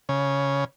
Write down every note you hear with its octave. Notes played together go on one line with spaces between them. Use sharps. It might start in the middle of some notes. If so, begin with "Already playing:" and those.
C#3